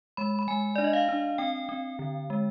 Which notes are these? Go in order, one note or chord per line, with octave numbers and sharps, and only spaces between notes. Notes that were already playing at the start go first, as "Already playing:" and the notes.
G#3 B5
B5
G#3 G#5
D4 D5
D#5
F5
D4
C4 G5
C4
D3
G#3